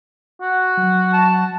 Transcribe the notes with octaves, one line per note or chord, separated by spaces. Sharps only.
F#4
F#3
A5